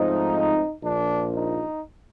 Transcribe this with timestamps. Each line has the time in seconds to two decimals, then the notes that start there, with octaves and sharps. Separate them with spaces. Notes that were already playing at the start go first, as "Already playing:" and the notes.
Already playing: G#2 F3 A3 C4 D#4
0.82 A#1 A#2 F3 D4
1.35 D#4